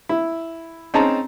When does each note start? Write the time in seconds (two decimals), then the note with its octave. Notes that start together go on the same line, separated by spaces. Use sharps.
0.09 E4
0.94 C4 C#4 D#4 G#4 A5 A#5